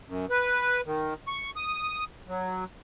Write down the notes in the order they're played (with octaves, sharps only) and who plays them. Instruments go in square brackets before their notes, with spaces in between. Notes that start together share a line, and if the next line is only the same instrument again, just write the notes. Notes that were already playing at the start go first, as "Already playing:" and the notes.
[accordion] F#2
B4
D#3
C#6
D#6
F#3